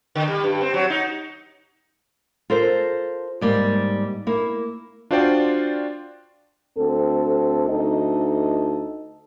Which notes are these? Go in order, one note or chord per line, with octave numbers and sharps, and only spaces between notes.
D3
G3
G2
C4
F#3
D#4
F4 A4 A#4 C5
G#2 G3 A#3
A#3 E4
D4 F4 F#4 C5 D5 G5
D2 C4 A4
D2 D#4 A4 D#5